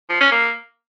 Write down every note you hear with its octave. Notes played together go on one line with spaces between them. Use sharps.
F3
C#4
A#3